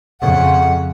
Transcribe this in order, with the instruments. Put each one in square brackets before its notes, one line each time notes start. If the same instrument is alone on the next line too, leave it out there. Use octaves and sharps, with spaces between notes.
[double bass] F2 C#3 [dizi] F#5